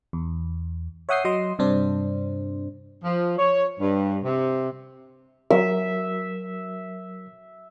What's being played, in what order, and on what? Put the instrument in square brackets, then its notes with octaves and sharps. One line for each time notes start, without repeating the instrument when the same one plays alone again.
[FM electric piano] E2
C#5 E5 F#5 D#6 G6 C7
F#3 D#5 C6 D#6
G2 C3 D4 C5
[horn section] F3
C#5
G2
C3
[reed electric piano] F#3 A#4 [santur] E5